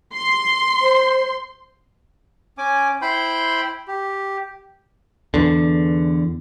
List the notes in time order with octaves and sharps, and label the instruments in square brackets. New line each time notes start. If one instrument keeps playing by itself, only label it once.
[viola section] C6
[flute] C5
[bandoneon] C#4 G#5 D6
E4 C5 G5 B5 C6 G6
G4
[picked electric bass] E2 D3